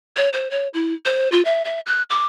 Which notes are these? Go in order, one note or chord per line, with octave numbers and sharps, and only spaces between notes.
C#5
C5
C#5
E4
C5
F4
E5
E5
F#6
D6